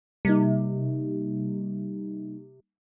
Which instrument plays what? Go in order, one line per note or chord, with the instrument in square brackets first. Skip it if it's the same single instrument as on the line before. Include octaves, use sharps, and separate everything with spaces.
[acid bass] C3 [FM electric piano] G3 A#3 D#4